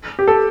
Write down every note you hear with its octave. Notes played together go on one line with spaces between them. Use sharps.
G4
A4